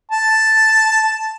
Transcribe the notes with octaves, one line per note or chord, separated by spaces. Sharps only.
A5